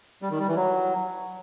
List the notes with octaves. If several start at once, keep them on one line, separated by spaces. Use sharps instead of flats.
G3
D#3
G3
E3
F#3